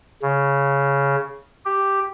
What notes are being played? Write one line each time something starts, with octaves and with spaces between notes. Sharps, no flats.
C#3
G4